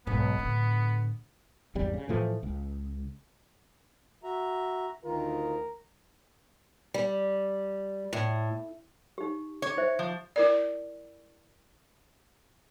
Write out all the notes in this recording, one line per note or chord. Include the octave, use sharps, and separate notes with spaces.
B1 G#2 B3
A2 D3
G#1 E2 G3
C#3
A2 E3 F3 A3
C#2
F#4 E5 A#5
D2 D#3 F4 A#4
G3
A2
D#4 G4
C#5
E4 C5 E5
F3
E4 A#4 D5